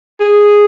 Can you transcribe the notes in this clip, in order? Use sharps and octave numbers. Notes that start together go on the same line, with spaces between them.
G#4